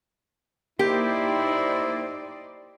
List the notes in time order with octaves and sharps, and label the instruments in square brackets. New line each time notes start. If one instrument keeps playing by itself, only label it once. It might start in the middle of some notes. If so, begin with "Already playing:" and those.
[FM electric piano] A#3 G5 [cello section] D#4 C5 D5 [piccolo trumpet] E4 [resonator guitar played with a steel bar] G4